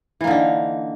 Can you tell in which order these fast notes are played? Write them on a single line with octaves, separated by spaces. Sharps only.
E3 A#3 D3 D#4